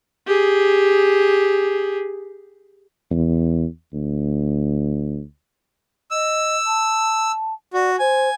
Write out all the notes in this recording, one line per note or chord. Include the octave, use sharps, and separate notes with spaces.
G4 G#4
E2
D2
D#5 E6
A5
F#4 D5
C5 G#5